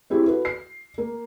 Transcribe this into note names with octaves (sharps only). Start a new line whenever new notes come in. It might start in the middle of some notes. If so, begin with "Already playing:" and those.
C4 E4 G4 G#4
F#4 A4 B4
C7
A#3